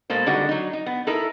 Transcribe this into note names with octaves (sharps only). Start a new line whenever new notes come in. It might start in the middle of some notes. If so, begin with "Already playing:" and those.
B2 G#3 A#3 A4 C5
D3 G3 G#3 D#4 F#4
F#3 D#4
D#4
B3
D#4 E4 A4 A#4